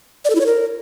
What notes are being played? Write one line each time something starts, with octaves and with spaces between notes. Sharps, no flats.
D5
A4
E4
C#5
A#4